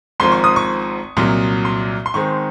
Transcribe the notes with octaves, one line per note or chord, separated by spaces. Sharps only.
G#1 G#2 F3 C6
C#6
D#6
C#6
C2 A#2 F#3
C6
C6
G#2 D#3 G#3 C4 C#6